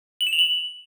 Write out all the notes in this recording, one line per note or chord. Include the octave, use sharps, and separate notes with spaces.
F#7
E7
F7
F#7